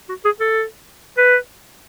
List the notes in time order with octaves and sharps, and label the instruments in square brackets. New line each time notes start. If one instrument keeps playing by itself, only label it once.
[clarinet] F#4
G#4
A4
B4